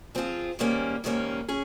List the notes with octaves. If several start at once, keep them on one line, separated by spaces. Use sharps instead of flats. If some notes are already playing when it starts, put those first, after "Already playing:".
F3 C4 F4 G#4
G#2 D#3 G3 A#3 C#4
G#2 D#3 G3 A#3 C#4
C#4 G#4